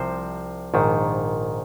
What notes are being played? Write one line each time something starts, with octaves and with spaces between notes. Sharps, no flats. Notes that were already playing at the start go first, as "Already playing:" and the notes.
Already playing: C2 C3 F3 C5
A#1 G#2 D#3